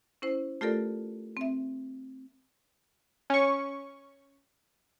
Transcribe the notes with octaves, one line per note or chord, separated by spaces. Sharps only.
C#4 E4 C5
A3 F4 G4 A4 A#4 D5
C4 E5
C#4 C#6